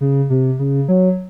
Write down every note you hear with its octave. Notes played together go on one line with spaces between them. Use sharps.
C#3
C3
C#3
F#3